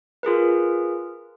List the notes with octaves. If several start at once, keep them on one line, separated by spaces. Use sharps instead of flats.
F4 G#4 A#4 B4